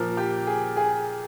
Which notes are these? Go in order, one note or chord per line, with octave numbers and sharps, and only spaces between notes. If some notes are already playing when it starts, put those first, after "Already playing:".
Already playing: A#2 F3 A#4
G4
G#4
G#4